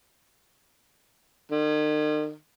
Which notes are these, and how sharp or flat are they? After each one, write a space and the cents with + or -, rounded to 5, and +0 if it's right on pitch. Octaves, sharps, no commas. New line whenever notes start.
D#3 -45